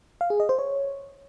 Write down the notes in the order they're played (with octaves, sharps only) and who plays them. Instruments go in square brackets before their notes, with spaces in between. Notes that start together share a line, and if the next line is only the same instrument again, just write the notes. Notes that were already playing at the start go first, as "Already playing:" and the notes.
[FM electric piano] F5
G#4
D#5
C5
C#5